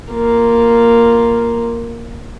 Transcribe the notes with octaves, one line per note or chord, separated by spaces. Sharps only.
A#3 F4